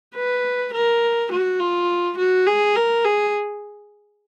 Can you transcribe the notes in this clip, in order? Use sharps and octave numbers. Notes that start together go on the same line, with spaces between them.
B4
A#4
F#4
F4
F#4
G#4
A#4
G#4